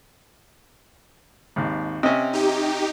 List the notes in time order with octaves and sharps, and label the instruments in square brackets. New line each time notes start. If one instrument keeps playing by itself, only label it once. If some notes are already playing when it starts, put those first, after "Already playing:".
[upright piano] G#1 D#2
[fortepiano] C3 C#4 [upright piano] D#5 E5 G#5
[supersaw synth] D#4 G4